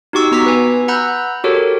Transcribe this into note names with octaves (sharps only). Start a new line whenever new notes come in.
D#4 F#4 G4 C#6 E6
B3 F#4 A#5 D6 E6 B6
B4 G#5
F#5 A#5 B5 E6 F#6 G6
F#4 G4 A4 A#4 C#5